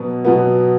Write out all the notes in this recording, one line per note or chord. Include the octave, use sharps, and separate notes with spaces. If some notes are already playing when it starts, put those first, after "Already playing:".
Already playing: B2 F#3 B3
B2 F#3 B3